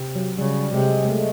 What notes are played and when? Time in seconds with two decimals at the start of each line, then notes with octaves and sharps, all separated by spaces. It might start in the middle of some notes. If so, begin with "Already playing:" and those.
Already playing: C3
0.15 F#3
0.38 C#3 G3
0.73 C3 G#3
1.05 G#3
1.09 A3